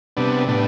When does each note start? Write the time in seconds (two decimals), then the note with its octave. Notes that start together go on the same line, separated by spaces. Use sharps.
0.17 C3 G3 B3 D4
0.47 A2 G3 B3 D4